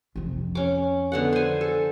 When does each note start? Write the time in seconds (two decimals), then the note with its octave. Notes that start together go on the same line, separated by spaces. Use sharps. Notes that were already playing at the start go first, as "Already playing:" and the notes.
0.16 F2 C3
0.55 C#4 D6
1.12 D3 B3 F#5
1.33 C5 G#5
1.61 A4